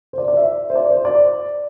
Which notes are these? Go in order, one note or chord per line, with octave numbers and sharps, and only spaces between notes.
C5
D5
D5
E5
C5
D5
C5
D5